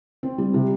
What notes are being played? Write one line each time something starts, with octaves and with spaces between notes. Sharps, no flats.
C4
G3
C3